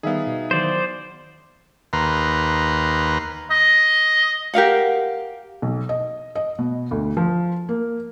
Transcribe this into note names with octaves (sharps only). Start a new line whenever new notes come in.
D#3 G3 B3 D#4 G#4 E5 F5
B2
D#3 E3 F#3 C5 D5
D#2 B4 A#5 C6
D#5
G4 A#4 F5 F#5
B1
D#5
D#5
B2
D2
F3
A#3